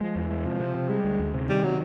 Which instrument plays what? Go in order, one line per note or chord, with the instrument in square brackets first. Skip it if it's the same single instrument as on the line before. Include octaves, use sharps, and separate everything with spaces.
[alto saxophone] F3 [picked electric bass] G#3
[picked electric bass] E2
[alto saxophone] E3
[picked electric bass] G#3
[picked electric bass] C3 [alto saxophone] F3
[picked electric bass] C3
C3
[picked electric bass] G3 [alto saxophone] G#3
[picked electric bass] D2
D2
C3
[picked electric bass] D#3 [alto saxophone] G3
[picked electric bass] C3 [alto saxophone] F#3